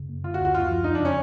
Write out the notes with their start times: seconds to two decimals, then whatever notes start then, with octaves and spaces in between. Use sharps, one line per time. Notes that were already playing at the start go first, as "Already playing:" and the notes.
Already playing: F#2 C#3
0.09 A#3
0.23 D3 F4
0.34 F#4
0.39 D2
0.45 F#4
0.54 F#2 F4
0.70 F3
0.84 F2 D#4
0.95 D4
1.00 C#3 C#4